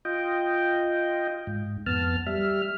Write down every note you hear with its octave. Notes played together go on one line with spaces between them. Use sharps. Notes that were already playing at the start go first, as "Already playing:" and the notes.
F4 D#5 G5
G#2
F2 B3 A5 F6
G3 E5 F6